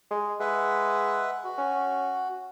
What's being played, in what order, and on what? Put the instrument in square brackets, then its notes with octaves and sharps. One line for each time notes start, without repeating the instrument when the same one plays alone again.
[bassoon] G#3
[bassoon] G#3 [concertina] B4 E5 F#5
[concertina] F#4
[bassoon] C#4